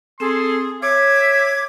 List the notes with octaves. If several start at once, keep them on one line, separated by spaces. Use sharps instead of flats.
C4 G#4 A4 C6
C#5 E5 D6 G#6